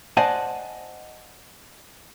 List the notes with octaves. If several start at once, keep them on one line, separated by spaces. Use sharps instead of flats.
C5 D5 D#5 F#5 G#5 A5